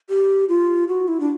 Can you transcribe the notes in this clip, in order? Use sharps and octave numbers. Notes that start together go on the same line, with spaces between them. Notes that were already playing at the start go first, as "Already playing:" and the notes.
G4
F4
F#4
E4
D4